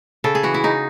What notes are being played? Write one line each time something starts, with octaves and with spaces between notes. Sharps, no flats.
C#3 A4
G#4
E3 F#4
E4
C#3 D#4